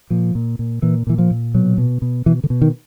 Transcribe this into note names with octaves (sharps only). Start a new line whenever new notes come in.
A#2 F3
A#2
A#2
A#2 E3
A#2 E3
F3
A#2
B2 F#3
B2
B2
B2 E3
D3
B2
D#3